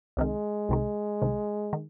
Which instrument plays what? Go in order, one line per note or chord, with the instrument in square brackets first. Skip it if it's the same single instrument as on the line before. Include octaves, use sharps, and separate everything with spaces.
[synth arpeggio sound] C2 C3 D#3 [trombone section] G#3
[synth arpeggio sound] C2 C3 D#3
C2 C3 D#3
D#3